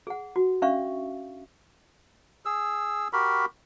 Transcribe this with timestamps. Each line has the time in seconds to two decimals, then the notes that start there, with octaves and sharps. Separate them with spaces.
0.07 G#4 F#5
0.36 F#4
0.62 C#4 D4 E5 F5 C#6
2.45 G#4 E6
3.13 F#4 G4 A#4 B5